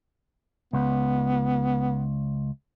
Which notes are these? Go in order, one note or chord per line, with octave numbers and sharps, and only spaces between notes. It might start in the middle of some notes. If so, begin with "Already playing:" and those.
C#2 B3